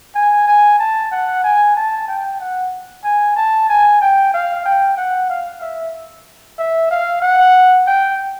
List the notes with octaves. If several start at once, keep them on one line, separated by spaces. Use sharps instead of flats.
G#5
G#5
A5
F#5
G#5
A5
G5
F#5
G#5
A5
G#5
G5
F5
G5
F#5
F5
E5
E5
F5
F#5
G5